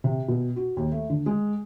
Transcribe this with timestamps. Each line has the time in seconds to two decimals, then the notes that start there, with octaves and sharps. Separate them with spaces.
0.04 C3
0.28 B2
0.56 F#4
0.77 D#2
0.92 A3
1.10 D3
1.26 G#3